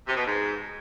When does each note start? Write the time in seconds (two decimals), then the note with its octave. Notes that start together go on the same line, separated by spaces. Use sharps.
0.07 C3
0.16 B2
0.25 G#2